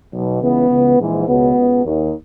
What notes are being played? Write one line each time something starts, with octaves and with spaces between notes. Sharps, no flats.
B1 B2
C#2 C#3 E3 B3
C#2 C#3 E3
A#1 G#2 E3
C#2 B2 B3
C#2 B2
D#2 D#3